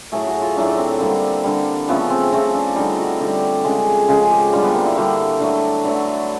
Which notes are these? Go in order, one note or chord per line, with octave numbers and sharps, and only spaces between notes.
A2 F#3 A3 G#4
F#4
F4
A2 F#3 A3 D4
C4
D3 G3 A#3
D3 G3
C#3 F3 A3 B3
C4
C#3 F3 A3 C4
D4
D3 G3 D#4
F#4
D3 G3 G4
C#3 F3 G#3
C#3 F3 G#3
G4
D3 G3 F4
B3
A#3
E4
D3 G3 F#4
D3 F#3 A3
D3 F#3 A3 B4